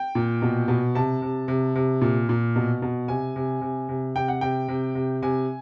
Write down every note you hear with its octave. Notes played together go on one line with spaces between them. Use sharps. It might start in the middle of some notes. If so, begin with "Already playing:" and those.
Already playing: G5
A#2
B2
B2
C3 A5
C3
C3
C3
A#2
A#2
B2
B2
C3 G#5
C3
C3
C3
C3 G5
F#5
C3 G5
C3
C3
C3 G#5